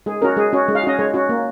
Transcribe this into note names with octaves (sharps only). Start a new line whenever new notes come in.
G#3 G#4
C#4 F#4 A#4
G#3 G#4
C#4 F#4
G#3
F5
C#4 F#4 D#5
G#3 C#5
C#4 F#4
A#3